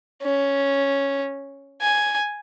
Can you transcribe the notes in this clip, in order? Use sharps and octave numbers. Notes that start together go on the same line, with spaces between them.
C#4
G#5